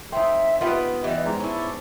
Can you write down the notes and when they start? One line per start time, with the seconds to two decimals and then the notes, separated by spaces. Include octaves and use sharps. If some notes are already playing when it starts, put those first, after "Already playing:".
0.12 C4 D#4 E5
0.61 B3 F4 G4 B4 D#5
1.04 E3 G3 D#5
1.26 G#2 A#5
1.40 C#4 D4 E4